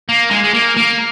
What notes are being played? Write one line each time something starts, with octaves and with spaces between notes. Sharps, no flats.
A#3
G#3
G#3
A#3
A#3